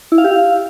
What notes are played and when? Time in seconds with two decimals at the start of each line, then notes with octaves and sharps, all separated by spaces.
0.12 E4
0.18 F5
0.24 G4
0.31 F5